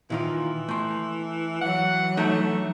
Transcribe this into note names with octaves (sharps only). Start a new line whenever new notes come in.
A#2 D#3 E3 F4
A3 C6
E3 F#3 F#5
A3 D4 D#4